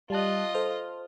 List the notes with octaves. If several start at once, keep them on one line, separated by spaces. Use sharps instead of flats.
G3 F4 D#5 A5 F#6
A4 C5 F6